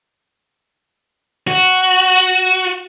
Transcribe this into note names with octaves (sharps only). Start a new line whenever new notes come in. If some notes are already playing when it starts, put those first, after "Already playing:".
F#4